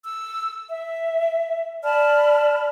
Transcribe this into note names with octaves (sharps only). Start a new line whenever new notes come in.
E6
E5
D5 A5 B5 F6